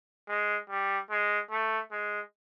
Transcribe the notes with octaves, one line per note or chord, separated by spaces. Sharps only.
G#3
G3
G#3
A3
G#3